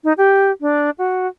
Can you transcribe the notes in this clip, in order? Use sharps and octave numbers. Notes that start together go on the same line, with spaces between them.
D#4
G4
D4
F#4